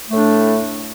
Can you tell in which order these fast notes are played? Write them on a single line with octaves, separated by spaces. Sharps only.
A3 A2 D4